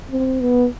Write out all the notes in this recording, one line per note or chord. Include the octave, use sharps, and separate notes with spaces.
C4
B3